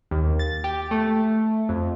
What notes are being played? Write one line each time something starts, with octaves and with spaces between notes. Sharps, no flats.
D#2
A6
G4
A3
F2